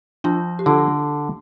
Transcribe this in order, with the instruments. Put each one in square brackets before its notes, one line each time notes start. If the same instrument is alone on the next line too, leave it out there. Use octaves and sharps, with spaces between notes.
[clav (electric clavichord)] F3 [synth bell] D4 F4
[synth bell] G4
[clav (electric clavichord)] D3 [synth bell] F4 A4